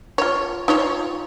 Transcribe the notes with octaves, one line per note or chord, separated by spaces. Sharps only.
F4 C#5
D#4 F4 C#5